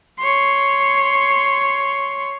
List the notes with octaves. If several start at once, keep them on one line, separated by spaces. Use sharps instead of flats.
C#5 C6